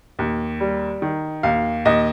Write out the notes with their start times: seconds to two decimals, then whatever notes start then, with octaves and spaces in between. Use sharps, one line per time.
0.19 D#2
0.60 G3
1.02 D#3
1.43 D#2 F5
1.85 D#2 D#5